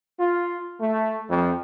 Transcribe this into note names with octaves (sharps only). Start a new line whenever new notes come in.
F4
A3
F2